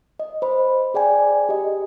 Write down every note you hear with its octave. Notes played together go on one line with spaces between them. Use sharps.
D#5
C5 B5
G#4 D5 G5 G#5
G4 D#5